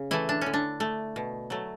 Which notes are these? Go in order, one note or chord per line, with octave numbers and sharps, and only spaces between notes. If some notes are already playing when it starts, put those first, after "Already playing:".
Already playing: C#3
E3 A3 E4
D4
D3 C#4
D4
A3
B2
F#3 A3